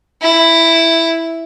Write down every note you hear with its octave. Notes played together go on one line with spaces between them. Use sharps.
E4